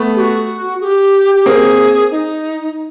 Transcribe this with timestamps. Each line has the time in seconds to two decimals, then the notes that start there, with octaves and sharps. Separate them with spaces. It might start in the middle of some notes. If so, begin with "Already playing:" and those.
Already playing: A3 B3
0.16 G4
0.20 F#4
0.81 G#4
0.84 G4
1.35 G4
1.46 A#3 C4 G#4
2.11 D#4